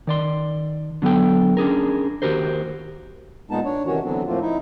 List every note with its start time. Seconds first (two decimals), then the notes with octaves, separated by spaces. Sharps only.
0.07 D#3 D5 C6
1.02 D3 F#3 B3 A4 G5
1.57 C#4 D4 G#4 A#4
2.22 D#2 G#2 F#4 G4 A#4 C5
3.51 A#2 G#3 B3 D#4 A5
3.65 D4 C#5
3.86 C3 D#3 E3 C#4 F#4 C#5
4.04 D3 E3 F#3 B3 C4 D4
4.27 A2 F3 A3 A#3 C4 F4
4.41 D#4 E4